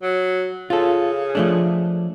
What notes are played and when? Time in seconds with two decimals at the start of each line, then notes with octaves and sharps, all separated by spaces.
0.02 F#3
0.70 C#3 F4 A4
1.35 F3 A3 D4